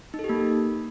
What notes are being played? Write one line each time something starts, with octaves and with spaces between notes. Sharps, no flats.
D#4
A4
G4
A#3